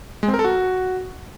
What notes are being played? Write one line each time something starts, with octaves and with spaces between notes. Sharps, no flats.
G#3
C4
A#4
A4
F#4